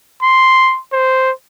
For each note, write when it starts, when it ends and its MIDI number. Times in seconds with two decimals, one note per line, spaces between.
0.23 0.80 84
0.93 1.31 72